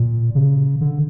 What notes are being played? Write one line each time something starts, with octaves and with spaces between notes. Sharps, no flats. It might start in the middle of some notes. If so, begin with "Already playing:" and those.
Already playing: A#2
C#3
D3